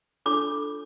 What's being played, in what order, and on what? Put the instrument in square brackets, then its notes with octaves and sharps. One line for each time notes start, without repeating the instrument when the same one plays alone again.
[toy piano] D4 F4 A4 C#5 D6